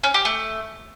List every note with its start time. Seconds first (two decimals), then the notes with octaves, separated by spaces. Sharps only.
0.03 C#4
0.14 G4
0.25 A3